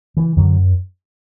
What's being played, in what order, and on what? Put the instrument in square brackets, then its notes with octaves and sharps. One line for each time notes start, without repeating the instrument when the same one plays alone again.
[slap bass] C#3 E3
F#2 D3 F#3